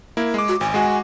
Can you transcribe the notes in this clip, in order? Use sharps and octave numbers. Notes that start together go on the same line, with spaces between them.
A#3 E4
G#3 D6
F#4
G#1 G#5
G#3 F#4